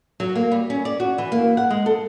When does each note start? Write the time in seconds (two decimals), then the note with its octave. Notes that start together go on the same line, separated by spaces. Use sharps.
0.20 F#3
0.35 A#3
0.52 G3
0.70 C#4
0.85 D5
1.00 F#4
1.18 E3
1.32 A#3
1.57 F#5
1.70 G#3
1.86 A4